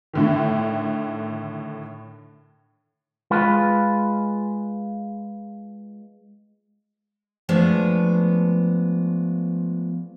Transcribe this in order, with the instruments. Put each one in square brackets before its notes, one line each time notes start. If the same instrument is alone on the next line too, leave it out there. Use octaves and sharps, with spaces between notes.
[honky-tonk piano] A2 D3 D#3
[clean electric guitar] G#3 F4 B4
[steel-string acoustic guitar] F3 G#3 A3 B3 D4